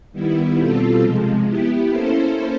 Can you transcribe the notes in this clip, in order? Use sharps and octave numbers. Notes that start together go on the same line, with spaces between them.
D#3 G3 B3 E4
B2 G3 C4 F4 A4
C3 F3 G#3
B3 E4 G4
A#3 C#4 E4 A4 C5